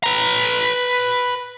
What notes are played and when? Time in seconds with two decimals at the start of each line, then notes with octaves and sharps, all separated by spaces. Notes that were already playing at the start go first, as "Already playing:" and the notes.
0.04 B4 A#5